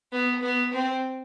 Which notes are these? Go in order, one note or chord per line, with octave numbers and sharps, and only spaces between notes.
B3
B3
C4